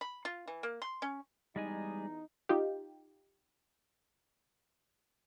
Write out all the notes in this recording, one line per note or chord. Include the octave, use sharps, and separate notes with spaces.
B5
F4
E3
A#3
C6
C#4
E2 G3 G#3 D#4 G#5
D#4 F4 G4